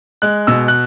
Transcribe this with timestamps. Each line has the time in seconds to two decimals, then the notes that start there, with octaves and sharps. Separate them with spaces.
0.22 G#3 F#6
0.47 B2 E6
0.68 F#6